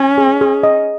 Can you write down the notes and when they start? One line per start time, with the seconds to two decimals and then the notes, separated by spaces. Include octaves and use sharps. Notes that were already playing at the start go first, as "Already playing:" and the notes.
Already playing: C#4 G#5
0.18 G#4
0.41 G#4
0.63 D#5